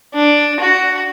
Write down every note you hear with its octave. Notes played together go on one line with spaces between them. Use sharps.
D4
F#4